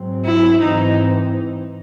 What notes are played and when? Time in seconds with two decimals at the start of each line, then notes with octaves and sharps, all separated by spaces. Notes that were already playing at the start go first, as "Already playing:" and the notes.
Already playing: G#2 F#3 C4
0.25 E4
0.61 G#2 E3 C4 D#4